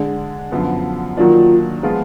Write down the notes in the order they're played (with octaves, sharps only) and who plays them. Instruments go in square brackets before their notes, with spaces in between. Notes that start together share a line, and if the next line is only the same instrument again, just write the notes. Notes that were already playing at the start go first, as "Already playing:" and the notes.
Already playing: [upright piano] D3 G#3 D4
F#2 D3 F3 B3
[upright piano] D#3 F#3 A#3 D4 [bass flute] F4
[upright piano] F3 G#3 B3 F4